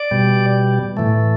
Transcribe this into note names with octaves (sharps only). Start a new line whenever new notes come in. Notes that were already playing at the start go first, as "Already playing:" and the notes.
Already playing: D5
B2 G3
A2 E3 A3